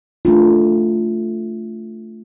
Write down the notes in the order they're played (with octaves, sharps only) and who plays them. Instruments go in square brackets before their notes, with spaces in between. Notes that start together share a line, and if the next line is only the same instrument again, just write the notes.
[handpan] A3 D4 F4